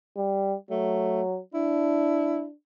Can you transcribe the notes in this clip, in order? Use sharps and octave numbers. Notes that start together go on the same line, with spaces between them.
G3
F#3 A3
D4 E4